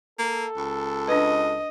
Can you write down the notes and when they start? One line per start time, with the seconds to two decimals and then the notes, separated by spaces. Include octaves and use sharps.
0.19 A#3 A4
0.57 C#2
1.08 D4 B4 D#5